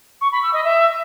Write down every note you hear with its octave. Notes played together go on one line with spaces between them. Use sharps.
C#6
B5
E6
D#5
E5